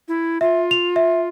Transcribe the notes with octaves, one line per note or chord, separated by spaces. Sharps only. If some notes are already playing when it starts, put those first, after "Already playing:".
E4
F4 E5
F7
E5